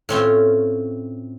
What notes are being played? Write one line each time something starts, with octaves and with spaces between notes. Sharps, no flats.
A2 C4 C#4 F4